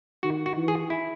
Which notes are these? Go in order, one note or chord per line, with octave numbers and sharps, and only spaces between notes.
D#3 F#4
F#4
E3
G#4
E4